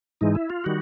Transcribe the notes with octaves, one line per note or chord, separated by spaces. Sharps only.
G#2 E3 G#3 D#4
E4
F4
D#3 G3 F#4